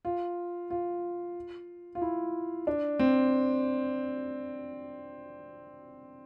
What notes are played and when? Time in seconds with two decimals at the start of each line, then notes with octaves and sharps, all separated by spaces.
0.05 F4
0.70 F4
1.95 F4
2.02 E4
2.67 D4
2.99 C4